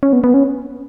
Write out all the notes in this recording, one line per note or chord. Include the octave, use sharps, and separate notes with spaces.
C#4
B3
B3
C#4